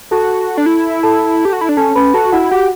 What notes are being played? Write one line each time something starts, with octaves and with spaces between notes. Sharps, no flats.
F#4 A4 A5
D4
E4
A4 A5
G4
F#4
E4
D4
C#4 A4 A5
C#4 B4 B5
F#4 A4 A5
E4 F#4 F#5
F#4 G4 F#5